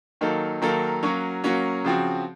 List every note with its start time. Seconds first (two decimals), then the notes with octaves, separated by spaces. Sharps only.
0.21 D#3 F#3 A#3 D#4 A4
0.62 D#3 F#3 A#3 D#4 A4
1.03 F#3 A#3 C#4 F#4
1.44 F#3 A#3 C#4 F#4
1.85 C#3 F3 C4 F#4